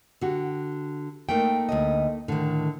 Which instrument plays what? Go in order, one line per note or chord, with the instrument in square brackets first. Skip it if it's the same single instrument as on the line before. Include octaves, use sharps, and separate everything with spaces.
[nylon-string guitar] D3 F#4 G4
[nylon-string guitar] A3 A#3 D#4 [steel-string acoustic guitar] G5
[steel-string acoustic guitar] D2 C#3 D#5
[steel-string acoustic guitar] A2 D#3 [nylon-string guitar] D3